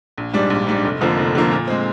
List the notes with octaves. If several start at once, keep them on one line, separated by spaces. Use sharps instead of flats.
A#1
G#2 G3 D4
A#1
G#2 G3 D4
F1
F2 D3 F3 A#3
F1
F2 D3 F3 A#3
A#2
G#3 C4